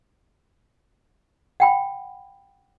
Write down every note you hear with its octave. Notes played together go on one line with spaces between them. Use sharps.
F#5 G5 B5